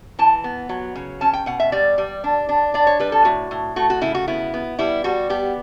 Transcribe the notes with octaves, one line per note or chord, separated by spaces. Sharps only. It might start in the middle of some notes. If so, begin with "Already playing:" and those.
E3 A5
B3
F#3
C#3
C#4 A5
G5
B2 F#5
E5
G3 D5
G3
D4
D4
D4 D5
C#5
G3 B4
A4
A2 F#4
A2
A3 F#4
F#4
C#3 E4
F#4
B3 E4
B3
G3 E4
G3 F#4
B3 G4